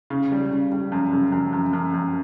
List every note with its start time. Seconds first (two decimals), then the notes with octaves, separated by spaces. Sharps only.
0.10 C#3
0.32 G3
0.51 C#3
0.72 G3
0.92 F#2
1.12 C#3
1.32 F#2
1.53 F#2
1.73 F#2
1.94 F#2